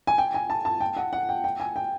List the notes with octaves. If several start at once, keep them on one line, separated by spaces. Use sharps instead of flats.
G#5
G5
G#5
A5
A5
G5
F#5
F#5
G5
G5
G#5
G5